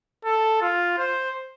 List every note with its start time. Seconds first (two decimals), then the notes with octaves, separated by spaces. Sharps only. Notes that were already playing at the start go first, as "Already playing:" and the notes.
0.24 A4
0.61 F4
0.98 C5